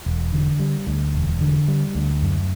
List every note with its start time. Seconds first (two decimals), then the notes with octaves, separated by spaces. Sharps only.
0.06 E1
0.33 D3
0.60 G3
0.87 D2
1.15 E1
1.41 D3
1.68 G3
1.95 D2
2.22 F#2